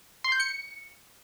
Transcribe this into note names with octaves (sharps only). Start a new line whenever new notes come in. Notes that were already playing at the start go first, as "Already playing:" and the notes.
C6
G6
C#7